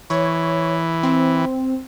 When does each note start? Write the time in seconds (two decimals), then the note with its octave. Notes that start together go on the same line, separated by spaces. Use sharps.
0.10 E3 C#5
1.03 C4